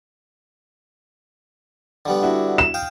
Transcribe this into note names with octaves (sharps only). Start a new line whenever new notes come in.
D3 G3 B3
D4 E4 F#4
E7
F5 G5 D#6